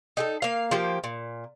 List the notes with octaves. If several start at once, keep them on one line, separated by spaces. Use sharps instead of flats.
D#4 G4 A4
A#3 F5
F3 A#3 G4
A#2